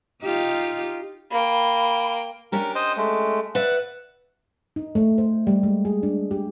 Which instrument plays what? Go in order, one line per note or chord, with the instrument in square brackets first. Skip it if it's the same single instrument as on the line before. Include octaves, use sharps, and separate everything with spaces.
[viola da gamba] D#4 F4 G4
[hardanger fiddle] A#3 G5 [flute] B5
[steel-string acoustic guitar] C#4 D4 G4 [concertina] A#4
[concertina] C5 D#5
G#3 A3
[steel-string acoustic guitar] B4 D5 E5 [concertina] F#5
[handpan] D#4
A3
C5
G3
G#3
G#4
D4
G4